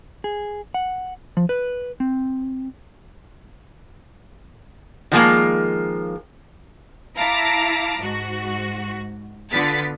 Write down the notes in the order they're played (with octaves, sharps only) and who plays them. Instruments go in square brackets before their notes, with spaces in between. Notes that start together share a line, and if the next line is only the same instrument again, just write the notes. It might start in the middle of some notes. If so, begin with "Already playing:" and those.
[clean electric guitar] G#4
F#5
F3
B4
C4
[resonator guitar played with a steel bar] D#3 F3 G#3 A#3
[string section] E4 F5 A5 A#5 D6
G#2 F#4
D3 B3 F4 A6 B6